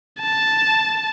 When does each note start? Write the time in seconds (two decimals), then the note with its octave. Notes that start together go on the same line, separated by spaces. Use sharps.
0.20 A5